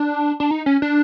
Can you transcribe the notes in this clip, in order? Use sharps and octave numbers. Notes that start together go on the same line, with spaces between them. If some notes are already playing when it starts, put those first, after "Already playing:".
Already playing: D4
D4
D#4
C#4
D4